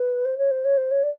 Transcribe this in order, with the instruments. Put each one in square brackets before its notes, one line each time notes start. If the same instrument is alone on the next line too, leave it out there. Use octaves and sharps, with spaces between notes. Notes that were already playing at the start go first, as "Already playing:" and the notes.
Already playing: [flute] B4
C5
C#5
C5
C#5
C5
C#5
D5